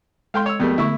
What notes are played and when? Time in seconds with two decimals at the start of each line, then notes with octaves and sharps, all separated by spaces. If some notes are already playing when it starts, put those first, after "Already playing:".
0.34 G#3 A4 F5 G5 C6
0.46 C#5 E6
0.60 F2 G3 A3 B3 G#4 A#4
0.78 D3 A3 E4 C#6